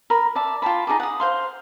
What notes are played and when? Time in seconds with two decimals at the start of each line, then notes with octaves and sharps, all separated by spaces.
0.10 A#4 B5
0.35 D5 E5 A5
0.62 F4 G5 A5 B5
0.87 D#4 G#4 A5 D6
1.00 F#5 D#6
1.20 C5 F5 C6